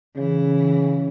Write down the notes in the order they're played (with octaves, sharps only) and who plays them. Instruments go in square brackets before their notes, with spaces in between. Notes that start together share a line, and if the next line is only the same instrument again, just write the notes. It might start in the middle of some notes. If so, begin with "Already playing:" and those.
[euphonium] C#3 [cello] E3